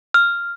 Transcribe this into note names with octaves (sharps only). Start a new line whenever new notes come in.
F6